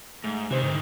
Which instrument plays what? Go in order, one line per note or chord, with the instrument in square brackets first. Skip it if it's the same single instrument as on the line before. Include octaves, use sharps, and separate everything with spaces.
[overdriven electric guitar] G#2 [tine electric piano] A3
[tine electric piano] C3 C5 [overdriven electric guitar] D#3 E3
[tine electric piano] G#2 D3